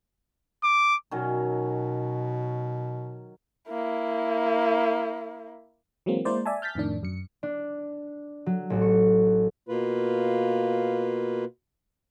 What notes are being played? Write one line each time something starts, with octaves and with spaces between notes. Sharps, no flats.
D6
B2 D#3 F#3 C#4
A#3 E4
E3 F#3 G#3 A#3 C4
G#3 A#3 E4 A#4 C5 D5
D5 E5 G#5 A5
F6 G6 A6 B6
F2 A2 D#3 D4
F#2 C#7
D4
F#3
A1
C#6
B2 A#3 F4 B4